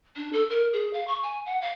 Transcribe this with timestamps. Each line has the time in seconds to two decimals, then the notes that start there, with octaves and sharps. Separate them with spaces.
0.16 D4
0.33 A4
0.50 A#4
0.73 G#4
0.93 F5
1.08 C#6
1.23 G#5
1.46 F#5
1.62 F5